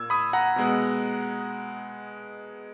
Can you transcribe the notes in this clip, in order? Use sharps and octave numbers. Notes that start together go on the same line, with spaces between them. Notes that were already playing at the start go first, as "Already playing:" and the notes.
Already playing: A#2 A#3 E6 G#6
B5 D#6
F#5 A#5
B2 G#3 B3